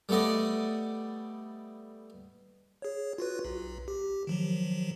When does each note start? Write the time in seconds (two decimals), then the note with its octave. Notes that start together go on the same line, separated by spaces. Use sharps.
0.09 G3 A3 B3 D5 D#5
2.82 G#4 C#5
3.18 F4 F#4 B4
3.45 B1
3.88 G4
4.27 D#3 F3 F#3